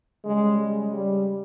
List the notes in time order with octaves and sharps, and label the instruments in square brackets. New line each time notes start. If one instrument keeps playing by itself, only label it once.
[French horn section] C#3 G3 G#3
G#3
G3